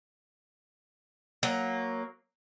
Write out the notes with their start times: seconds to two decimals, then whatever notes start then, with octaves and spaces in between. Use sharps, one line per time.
1.43 F#3 A#3